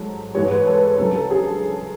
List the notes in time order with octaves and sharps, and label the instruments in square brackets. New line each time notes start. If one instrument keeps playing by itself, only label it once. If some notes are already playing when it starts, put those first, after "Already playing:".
Already playing: [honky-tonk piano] G#2 F#3 A4
G#2 E3 G#3 C#5
B4
A4
D2 C#3 F#3 A4
A4
G#4